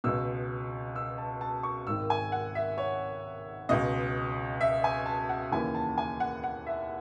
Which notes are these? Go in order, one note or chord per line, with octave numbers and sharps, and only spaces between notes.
C#2 B2 E6
E6
A5
A5
C#6
G#1 G#2 D#3 E6
G#5
F#5
E5
C#5
C#2 B2 D#5
E5
G#5
A5
F#5
D#2 C#3 E3 G#5
A5
G#5
F#5
F#5
E5